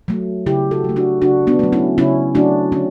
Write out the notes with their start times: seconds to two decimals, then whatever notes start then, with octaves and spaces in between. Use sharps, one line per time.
0.08 F#3 A3
0.46 C#3 E4 G4
0.71 F#4 A4
0.84 F#3 A3
0.96 D4 F#4
1.22 C#3 D4 F#4
1.47 B3 D4
1.59 F#3 A3
1.72 C#4 E4
1.98 C#3 C#4 E4
2.35 F#3 A3 D4 F#4
2.72 D3 C#4